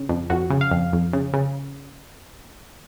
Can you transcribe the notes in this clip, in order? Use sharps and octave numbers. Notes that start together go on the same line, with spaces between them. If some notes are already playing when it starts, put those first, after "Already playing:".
Already playing: C#3
F2
F2 F#4
C#3
F5
F2
F2
C#3
C#3